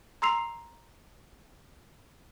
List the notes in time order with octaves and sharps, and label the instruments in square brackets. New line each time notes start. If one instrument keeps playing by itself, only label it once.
[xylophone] A#5 C6 E6 C7 F7